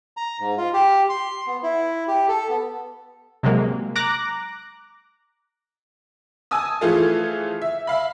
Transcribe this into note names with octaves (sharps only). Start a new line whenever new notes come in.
A#5
G#2
F4
G4
C6
B3
E4
G4
A4
B3
C3 F#3 G#3 A#3
A#5 D6 F#6 A#6
G#5 A5 D#6 E6
E3 F3 A3 F4 G#4 A4
E5
E5 F5 B5